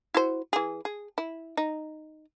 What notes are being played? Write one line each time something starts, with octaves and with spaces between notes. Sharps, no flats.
E4 F#4 C5
E3 G#4
G#4
E4
D#4